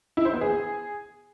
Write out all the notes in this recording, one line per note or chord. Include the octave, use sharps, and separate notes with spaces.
E4
C5
B3
G#4